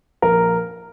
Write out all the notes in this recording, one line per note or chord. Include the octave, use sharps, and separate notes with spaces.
A#1 A#4